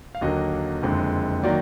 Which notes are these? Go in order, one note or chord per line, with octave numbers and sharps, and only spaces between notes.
F5
D#2 D3 F#3 A#3 D#5
F#1 F2 D3 G#3
D#3 F#3 A#3 D5